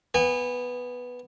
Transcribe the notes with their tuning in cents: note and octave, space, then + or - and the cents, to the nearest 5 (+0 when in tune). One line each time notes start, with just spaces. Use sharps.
B3 +0 G#5 -30